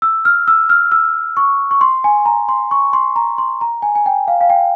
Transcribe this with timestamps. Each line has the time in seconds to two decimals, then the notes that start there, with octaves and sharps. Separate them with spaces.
0.02 E6
0.25 F6
0.48 E6
0.70 F6
0.92 E6
1.37 C#6
1.71 C#6
1.81 C6
2.04 G#5
2.26 A#5
2.49 C6
2.71 C#6
2.93 C6
3.16 A#5
3.38 C6
3.61 A#5
3.82 G#5
3.95 G#5
4.06 G5
4.28 F5
4.41 F5
4.50 G5